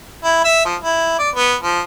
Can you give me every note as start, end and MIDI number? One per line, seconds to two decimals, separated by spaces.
0.24 0.42 64
0.44 0.65 76
0.65 0.75 53
0.82 1.14 64
1.19 1.29 74
1.35 1.55 59
1.62 1.80 53